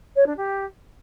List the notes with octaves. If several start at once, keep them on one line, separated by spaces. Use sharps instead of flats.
C#5
D4
G4